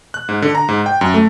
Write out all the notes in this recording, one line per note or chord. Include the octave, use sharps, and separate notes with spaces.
F#6
G#2
D3
A#5
G#2
G5
F#2
A3